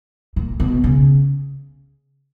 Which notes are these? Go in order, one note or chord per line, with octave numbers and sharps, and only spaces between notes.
A#2
B2
C#3